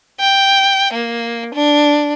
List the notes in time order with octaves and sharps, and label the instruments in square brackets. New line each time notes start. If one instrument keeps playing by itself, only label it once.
[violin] G5
A#3
D4